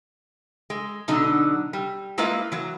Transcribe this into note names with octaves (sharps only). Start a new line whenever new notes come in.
G#3
B2 D3 F#3 D#4
G3
G#3 A#3 E4 F4 B4 F5
E3 F#3